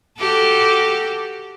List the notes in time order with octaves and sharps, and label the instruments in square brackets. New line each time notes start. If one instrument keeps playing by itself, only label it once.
[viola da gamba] F#4 G4 A4